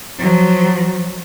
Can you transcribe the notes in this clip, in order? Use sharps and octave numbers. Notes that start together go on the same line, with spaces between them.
F3 F#3